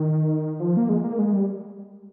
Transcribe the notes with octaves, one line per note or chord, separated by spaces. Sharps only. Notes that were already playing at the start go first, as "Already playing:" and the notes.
Already playing: D#3
F3
A#3
G#3
A#3
G#3
G3